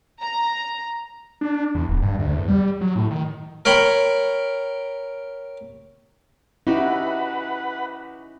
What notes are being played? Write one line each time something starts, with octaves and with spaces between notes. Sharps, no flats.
A#5
D4
E2
D1
G2
D2
E2
G3
F#3
A2
D#3
A#4 C#5 G5 B5 C6
C#4 D#4 E4 F#4 G4 B4 F#5